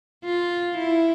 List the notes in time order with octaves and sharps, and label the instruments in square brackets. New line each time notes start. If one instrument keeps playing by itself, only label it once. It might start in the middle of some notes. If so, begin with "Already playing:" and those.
[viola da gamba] F4
E4